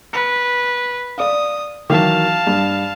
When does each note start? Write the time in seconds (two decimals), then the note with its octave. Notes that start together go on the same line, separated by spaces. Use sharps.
0.13 B4 C#7
1.18 D5 F5 D#6
1.90 D#3 E3 F#3 F5 A5
2.47 G2